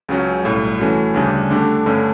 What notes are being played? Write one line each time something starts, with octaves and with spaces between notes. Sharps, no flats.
C#2 C#3 F#3 C#4
B1 A2 G3
E3 A3 C#4 F#4
D2 C#3 G3 D4
D3 A3 D4 G4
G2 D3 A3 C#4